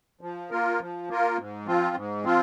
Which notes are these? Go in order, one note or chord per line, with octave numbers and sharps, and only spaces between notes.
F3
A#3 F4 A#4
F3
A#3 F4 A#4
G#2
F3 C4 F4
G#2
F3 C4 F4